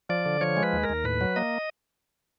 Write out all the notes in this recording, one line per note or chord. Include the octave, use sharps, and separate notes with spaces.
F3 D5
D3
F3 C#5
G#3
B4
D#2
A#4
D#2
A2 B4
F#3
A#3 D#5